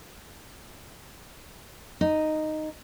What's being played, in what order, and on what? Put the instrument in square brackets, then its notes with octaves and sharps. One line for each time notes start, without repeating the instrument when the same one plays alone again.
[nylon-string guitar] D#4